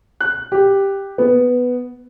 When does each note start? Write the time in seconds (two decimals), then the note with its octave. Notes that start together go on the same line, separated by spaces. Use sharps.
0.21 F#6
0.52 G4
1.18 B3